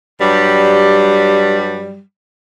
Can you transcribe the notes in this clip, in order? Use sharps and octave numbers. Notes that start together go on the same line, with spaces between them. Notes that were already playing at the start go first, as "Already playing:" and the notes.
G2 F#3 G3